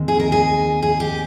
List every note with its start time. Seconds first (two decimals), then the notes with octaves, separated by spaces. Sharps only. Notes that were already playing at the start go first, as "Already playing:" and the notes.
Already playing: D#2 D#3 G#3 C4
0.08 G#4
0.20 A#4
0.32 G#4
0.82 G#4
1.00 G4